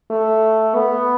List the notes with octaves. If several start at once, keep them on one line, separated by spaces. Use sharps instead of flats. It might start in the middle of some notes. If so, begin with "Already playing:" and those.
A3
B3